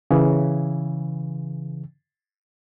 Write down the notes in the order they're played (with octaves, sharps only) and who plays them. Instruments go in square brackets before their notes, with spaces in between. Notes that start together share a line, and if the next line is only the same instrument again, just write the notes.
[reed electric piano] C#3 E3